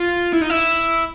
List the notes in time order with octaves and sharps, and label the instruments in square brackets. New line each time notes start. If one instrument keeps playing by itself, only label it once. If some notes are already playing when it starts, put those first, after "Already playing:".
Already playing: [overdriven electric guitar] F4
E4
D#4
E4